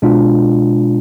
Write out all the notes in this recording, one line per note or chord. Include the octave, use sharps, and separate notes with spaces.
B2 G#3 D4 F4